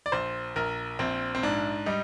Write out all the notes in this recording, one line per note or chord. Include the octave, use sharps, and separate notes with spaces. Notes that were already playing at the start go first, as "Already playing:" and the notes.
D5
A#1 C5
A#1 A#4
A#1 C4
C4
G#2 D4
G3 D#4